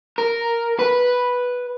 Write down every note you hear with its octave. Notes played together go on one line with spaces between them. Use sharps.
A#4
B4